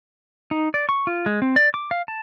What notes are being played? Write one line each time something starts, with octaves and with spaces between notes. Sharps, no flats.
D#4
D5
C#6
F4
G#3
C4
D5
D6
F5
A5